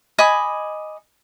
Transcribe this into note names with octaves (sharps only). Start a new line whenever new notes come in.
D#5 G#5 B5 D6